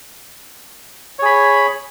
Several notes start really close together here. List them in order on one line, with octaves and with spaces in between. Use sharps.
C#5 G#4 B5